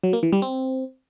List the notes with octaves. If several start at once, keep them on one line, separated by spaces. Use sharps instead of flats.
F#3
A#3
E3
G3
C4